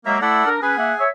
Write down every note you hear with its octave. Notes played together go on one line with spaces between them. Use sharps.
F#3 G#3 A#3 E5 A#5
A3 E4 A4 D5 F#5
D4 A#4
C#4 G#4 B4 G#5
A#3 E5 F#5
C#5 E5